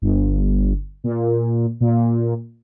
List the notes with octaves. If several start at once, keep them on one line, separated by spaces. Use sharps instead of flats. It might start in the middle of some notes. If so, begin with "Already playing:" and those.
G1
A#2
A#2